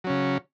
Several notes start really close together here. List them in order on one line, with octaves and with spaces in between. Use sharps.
F#3 C#4 C#3